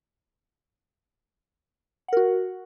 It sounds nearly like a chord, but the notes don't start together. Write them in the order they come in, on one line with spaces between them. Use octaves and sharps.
F#5 A#4 F#4